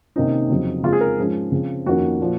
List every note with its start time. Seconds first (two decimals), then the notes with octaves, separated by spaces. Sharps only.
0.16 C3 D#3 A#3 C#4 D#4
0.50 F2 C#3 F#3 C4
0.83 C#3 G#3 C4 F4
0.93 G#4
1.01 A#4
1.18 G#2 F3 G#3 C#4
1.52 C#3 F3 C4
1.86 F2 D#3 A#3 C#4 F#4
2.19 A#2 F3